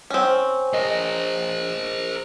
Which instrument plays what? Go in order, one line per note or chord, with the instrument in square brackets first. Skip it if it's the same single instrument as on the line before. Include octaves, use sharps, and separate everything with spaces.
[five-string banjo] C4 C#4
[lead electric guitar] A#4 C5 [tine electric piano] D#5